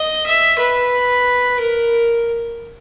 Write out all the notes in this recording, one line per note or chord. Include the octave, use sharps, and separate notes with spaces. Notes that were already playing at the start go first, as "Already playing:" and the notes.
Already playing: D#5
E5
B4
A#4